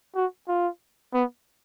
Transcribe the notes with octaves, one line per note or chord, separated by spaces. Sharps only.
F#4
F4
B3